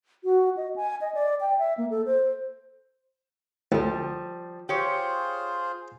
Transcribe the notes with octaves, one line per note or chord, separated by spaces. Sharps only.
F#4
D#5
G#5
D#5
D5
G5
E5
A#3
A4
C5
D2 F3 G3
F4 G4 G#4 C5 C#5